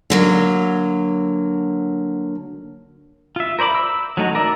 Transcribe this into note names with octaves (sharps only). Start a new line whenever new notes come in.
D3 F#3 A#3
F4 E5
A#4 C5 D5 B5 D6
E6
F#3 A3 D#4 F#4
A#4 D5 E5